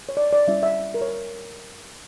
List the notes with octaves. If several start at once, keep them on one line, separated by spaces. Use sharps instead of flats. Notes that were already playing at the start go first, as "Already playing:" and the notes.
C#5
D5
D5
G3 C#4 E4 E5
E5
A#4
C#5